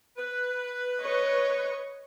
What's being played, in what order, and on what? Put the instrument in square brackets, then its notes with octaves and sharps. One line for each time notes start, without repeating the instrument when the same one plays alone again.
[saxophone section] B4
[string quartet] C#5 D#5 C#6